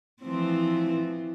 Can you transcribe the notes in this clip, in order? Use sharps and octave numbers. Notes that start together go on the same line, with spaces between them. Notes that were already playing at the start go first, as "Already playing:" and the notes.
E3 F3 C4